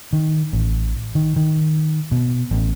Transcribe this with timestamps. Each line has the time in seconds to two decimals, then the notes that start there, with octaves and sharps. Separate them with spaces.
0.13 D#3
0.53 A1
1.15 D#3
1.36 D#3
2.12 B2
2.51 A1